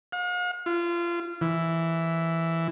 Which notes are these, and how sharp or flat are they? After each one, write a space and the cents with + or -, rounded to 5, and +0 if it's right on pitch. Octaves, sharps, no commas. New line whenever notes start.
F5 +45
F4 -25
E3 +0